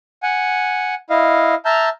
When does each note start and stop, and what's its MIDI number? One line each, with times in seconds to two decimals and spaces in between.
0.23 0.95 78
0.23 0.95 80
1.10 1.55 64
1.10 1.55 75
1.10 1.55 77
1.65 1.89 76
1.65 1.89 81
1.65 1.89 82
1.65 1.89 89
1.65 1.89 91